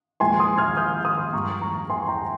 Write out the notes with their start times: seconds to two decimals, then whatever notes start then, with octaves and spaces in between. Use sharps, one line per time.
0.20 A#2 F3 G#3 G#5 C6
0.40 C6 D#6
0.58 F6 G#6
0.77 D#6 G6
1.05 C6 D#6
1.33 G2 F3 G#3 A#5 C#6
1.61 A#5 C#6
1.90 G#5 C6
2.08 G5 A#5